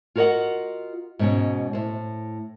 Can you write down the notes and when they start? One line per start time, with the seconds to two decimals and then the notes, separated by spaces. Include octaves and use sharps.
0.15 F4 F#4 A#4 C#5 D#5 F#5
1.19 G#2 B2 C#4
1.73 A2 C5